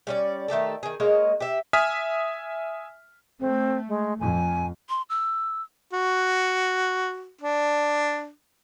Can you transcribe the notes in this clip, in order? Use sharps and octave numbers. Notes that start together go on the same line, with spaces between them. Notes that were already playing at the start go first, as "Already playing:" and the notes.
G3 C#4 D5
D#3 A3 G4 A4
D#3 G#4
G#3 A#3 C#5 D#5
G4 E5
E5 G#5 D#6 F6 B6
A3 C4
G#3
F2 G#5
C6
E6
F#4
D4